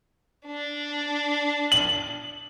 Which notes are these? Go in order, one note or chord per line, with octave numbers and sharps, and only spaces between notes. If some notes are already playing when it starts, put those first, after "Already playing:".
D4
F#7